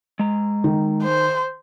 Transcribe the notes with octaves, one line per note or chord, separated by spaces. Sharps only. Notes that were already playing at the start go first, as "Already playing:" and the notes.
G#3 A#5
D#3
C5